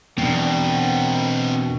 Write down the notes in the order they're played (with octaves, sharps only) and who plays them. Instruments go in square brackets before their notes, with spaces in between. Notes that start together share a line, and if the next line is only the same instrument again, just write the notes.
[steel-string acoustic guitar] E2 D4 [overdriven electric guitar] B2 [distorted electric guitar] C4 A#4 [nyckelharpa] G5